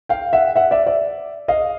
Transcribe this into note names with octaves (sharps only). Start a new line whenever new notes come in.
F5 G5
E5 F#5
E5 F#5
D5 E5
D5 E5
D#5 F5